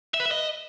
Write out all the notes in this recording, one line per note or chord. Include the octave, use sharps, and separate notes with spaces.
E5
B4
E5
D#5